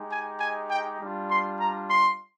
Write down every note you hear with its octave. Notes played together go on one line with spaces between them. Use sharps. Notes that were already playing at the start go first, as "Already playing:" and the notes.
Already playing: G#3 D#4 G4
G#5
G#5
G5
G3 D4 F4
C6
A#5
C6